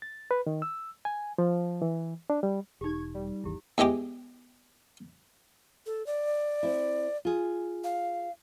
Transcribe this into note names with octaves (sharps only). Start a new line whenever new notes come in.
A6
B4
D#3
E6
G#5
F3
E3
D4
G3
E1 D#4 G4 C#6 G#6
G3
G#1 D#2 E3 E4 G4
E2 E3 G#3 G4 D6
A4
D5
C4 E4
F4 G#4
F5